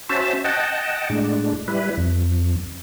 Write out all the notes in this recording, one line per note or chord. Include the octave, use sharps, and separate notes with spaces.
C#4 F#4 C5 E5 A5
D#5 F#5 G5 A5
A2 G#3 D4
G3 E4 B4
F2